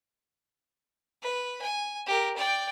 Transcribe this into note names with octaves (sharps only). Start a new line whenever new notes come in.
B4
G#5
G4 A#4
D5 G5